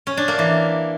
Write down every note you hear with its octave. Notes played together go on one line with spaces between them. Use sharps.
C#4
D4
A#3
E3